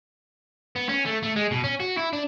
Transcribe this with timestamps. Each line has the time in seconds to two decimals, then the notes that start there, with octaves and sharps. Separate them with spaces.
0.76 B3
0.89 C#4
1.06 A3
1.23 A3
1.36 G#3
1.51 B2
1.64 C#4
1.80 F#4
1.97 E4
2.13 D4